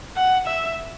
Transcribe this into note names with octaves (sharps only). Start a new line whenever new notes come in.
F#5
E5